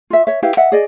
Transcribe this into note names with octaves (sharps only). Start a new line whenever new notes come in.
F4 E5
C#5 E5
E4 G4 B4 F5
D#5 E5 F#5
G#4 D5 D#5